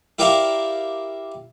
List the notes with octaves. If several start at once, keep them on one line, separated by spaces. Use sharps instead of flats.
E4 G4 A#4 D5 E5 F5